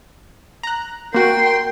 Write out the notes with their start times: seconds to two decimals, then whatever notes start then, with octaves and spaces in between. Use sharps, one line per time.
0.63 A#5 F#6
1.15 A#3 F#4 A#4 G5 C6